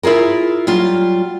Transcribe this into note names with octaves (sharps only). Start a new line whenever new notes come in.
E4 F4 G#4 A#4
F#3 G3 F4